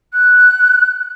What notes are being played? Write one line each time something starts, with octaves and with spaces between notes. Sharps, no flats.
F#6